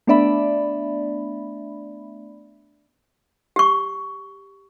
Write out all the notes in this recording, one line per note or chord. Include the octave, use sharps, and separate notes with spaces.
A3 B3 D4 D5 E5 B5
G4 C#6